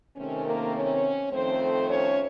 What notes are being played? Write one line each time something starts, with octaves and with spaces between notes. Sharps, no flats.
C3 D#3 A3 C4 C#4
A#3 A#4
C#4 C#5
F2 D#3 A3 C4 C5
C#4 C#5